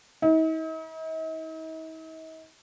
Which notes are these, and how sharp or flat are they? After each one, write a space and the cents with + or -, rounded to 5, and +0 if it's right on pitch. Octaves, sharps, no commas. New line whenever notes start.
D#4 +45